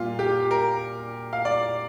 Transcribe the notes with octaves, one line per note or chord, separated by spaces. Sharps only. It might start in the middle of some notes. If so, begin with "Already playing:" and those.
Already playing: A#2 G3 A#3 F4
G4
A#4
F5
D5